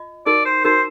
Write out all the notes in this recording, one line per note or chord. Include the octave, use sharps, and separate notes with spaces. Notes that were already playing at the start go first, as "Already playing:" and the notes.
Already playing: F4 D#5
D#4 F#4 A#4 D5
C5
D#4 F#4 A#4 C5